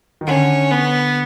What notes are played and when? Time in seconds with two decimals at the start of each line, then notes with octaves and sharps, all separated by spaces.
0.21 D#3
0.27 D3 C#4
0.71 B3